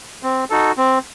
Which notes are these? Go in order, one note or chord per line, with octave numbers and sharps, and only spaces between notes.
C4
D#4 F#4 A4
C4